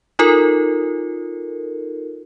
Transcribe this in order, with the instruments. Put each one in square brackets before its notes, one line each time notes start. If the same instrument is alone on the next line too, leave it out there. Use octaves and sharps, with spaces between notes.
[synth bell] D#4 F4 A4 A#4